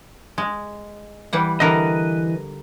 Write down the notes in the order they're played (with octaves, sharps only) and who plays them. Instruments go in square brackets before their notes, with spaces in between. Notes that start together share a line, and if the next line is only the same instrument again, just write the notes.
[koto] G#3
E3 G3 F#5
[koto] D3 G3 A#4 [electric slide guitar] E3 B4 D#5